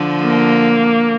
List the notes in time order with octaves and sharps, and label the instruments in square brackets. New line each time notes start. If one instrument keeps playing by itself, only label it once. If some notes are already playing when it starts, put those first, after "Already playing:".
Already playing: [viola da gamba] D3 F3
[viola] A#3